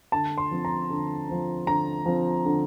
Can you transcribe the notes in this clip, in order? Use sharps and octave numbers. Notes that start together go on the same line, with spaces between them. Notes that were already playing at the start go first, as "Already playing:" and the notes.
D3 A5
C6
F3 C4
A#5
D3
F3 C4
D3 A#5
F3 C4
D3